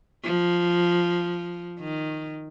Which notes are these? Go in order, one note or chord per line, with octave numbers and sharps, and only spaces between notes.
F3
D#3